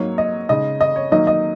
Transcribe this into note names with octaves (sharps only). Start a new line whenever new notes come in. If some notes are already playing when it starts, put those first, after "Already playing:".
Already playing: G#2 F#3 A#3 C#5
D#5
C#3 G#3 D#4 D#5
D#5
C#5
D#3 F#3 A#3 D#4 D#5
D#5